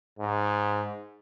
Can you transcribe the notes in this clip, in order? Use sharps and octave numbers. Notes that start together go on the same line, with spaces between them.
G#2